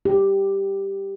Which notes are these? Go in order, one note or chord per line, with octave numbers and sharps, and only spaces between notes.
G4